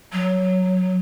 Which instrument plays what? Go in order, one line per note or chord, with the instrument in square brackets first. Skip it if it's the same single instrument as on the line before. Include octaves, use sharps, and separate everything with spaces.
[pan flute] F#3